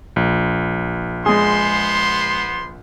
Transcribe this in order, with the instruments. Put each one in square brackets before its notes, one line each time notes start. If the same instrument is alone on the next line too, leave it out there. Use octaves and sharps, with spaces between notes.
[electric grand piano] A#1
[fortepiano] G#3 G#4 [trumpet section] B3 C5 C6